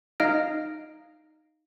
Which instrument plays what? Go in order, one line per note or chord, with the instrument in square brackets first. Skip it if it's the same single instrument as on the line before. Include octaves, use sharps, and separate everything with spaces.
[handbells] D#4 D#5 F5 F6 A#6 D7